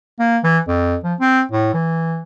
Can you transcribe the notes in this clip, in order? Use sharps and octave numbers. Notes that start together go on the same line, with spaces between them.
A#3
E3
F2
F3
C4
A2
E3